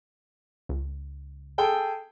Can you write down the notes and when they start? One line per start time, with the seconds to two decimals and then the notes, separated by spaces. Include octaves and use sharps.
0.69 C#2
1.58 G#4 A4 G5